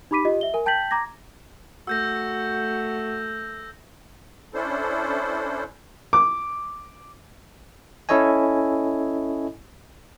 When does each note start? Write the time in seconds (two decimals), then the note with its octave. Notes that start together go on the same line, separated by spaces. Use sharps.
0.11 D#4 G4 B5 D6 B6 D#7
0.25 F4 G4 D#5
0.41 E5 G7
0.54 A#4 G#5
0.66 G5 A5 G6 A6 B6 F#7
0.91 A#5 D6 G#6 A#6
1.87 A3 F#4 E6 G6 A#6
4.54 C#4 D4 E4 A4 C5
6.13 D6
8.09 C#4 E4 A4 C#5 D#5 G#5